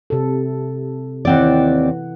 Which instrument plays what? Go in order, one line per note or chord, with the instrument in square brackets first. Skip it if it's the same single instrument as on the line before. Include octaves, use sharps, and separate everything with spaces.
[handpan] C3 A4
[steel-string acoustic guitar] D#2 C4 D5 [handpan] E3 F#5